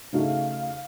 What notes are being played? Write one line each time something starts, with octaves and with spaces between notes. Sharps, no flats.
C#3 A3 D#4 F#4 F5